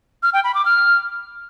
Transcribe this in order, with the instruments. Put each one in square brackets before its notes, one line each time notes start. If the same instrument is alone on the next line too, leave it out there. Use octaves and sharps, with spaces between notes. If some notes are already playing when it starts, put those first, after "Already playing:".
[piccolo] F6
G5
B5
D6
F6